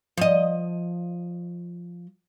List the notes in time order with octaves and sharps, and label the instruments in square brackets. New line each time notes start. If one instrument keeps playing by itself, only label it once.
[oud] F3 D#5